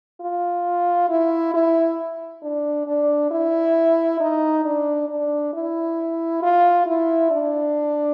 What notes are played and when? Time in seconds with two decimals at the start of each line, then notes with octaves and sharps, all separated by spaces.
0.21 F4
1.10 E4
1.54 E4
2.43 D4
2.87 D4
3.31 E4
4.20 D#4
4.64 D4
5.09 D4
5.54 E4
6.43 F4
6.87 E4
7.31 D4